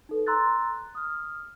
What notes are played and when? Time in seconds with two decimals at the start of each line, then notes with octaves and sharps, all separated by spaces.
0.09 D#4 A4 B4
0.27 A#5 C6 E6 F#6 A6
0.95 D#6 F6